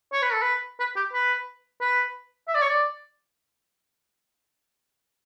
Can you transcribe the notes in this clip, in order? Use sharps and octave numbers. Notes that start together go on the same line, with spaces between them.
C#5
B4
A4
B4
B4
G4
B4
B4
E5
D5
C#5
D5